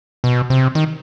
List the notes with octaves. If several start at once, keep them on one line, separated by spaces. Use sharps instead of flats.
B2
C3
D#3